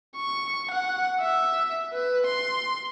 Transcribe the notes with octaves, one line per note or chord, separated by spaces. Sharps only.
C#6
F#5
E5
B4
C6